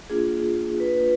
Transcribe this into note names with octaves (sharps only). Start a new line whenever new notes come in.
A#3 D4 F4 G#4
B4